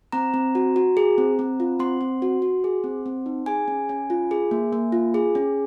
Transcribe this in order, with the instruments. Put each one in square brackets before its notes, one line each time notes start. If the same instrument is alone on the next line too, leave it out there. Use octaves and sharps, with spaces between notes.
[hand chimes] C4 A#5
C4
F#4
F#4
G#4
C4
C4
F4
C4 C6
C4
F#4
F#4
G#4
C4
C4
D#4
G#4 G#5
C#4
C#4
F4
G#4
A#3
A#3
F4
G#4
C#4